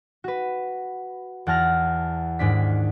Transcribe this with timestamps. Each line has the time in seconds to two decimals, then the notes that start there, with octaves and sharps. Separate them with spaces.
0.24 F#4 B4
1.47 E2 F#5 A5 F6 A#6
2.39 D#2 G#2 G#3 D4 B6